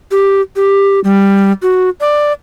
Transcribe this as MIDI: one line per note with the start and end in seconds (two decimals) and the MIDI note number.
0.11 0.41 67
0.56 1.00 67
1.04 1.52 55
1.62 1.90 66
2.01 2.33 74